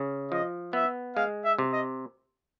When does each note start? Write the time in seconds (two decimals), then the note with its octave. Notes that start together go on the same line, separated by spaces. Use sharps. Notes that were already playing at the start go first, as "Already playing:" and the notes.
Already playing: C#3
0.31 F3 D#5
0.73 B3 E5
1.16 G#3 F5
1.45 E5
1.58 C3
1.73 D#5